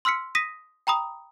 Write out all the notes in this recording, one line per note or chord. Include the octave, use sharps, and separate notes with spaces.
C6 E6 F6 B6 C#7
D#6 A#6 B6 D#7
G5 A#5 B5 D#6